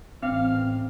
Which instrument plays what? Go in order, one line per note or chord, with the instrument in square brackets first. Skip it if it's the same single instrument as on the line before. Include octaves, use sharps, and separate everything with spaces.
[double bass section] A1 [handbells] C4 [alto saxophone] F5